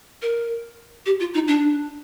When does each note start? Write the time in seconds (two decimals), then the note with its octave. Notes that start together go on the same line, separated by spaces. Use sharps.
0.22 A#4
1.06 G4
1.20 F4
1.34 D#4
1.48 D4